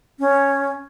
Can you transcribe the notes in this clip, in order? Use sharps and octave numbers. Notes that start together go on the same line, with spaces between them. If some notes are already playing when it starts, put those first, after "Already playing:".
C#4